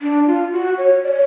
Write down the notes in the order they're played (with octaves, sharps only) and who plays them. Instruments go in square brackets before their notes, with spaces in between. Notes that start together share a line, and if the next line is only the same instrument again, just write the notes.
[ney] D4
F4
F#4
C#5
D5
C#5